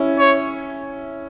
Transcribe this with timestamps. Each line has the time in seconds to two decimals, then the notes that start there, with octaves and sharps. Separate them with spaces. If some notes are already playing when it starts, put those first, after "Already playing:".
Already playing: C#4 E4
0.18 C#5